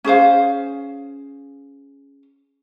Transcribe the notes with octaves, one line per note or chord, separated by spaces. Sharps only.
C#4 G#4 C5 F5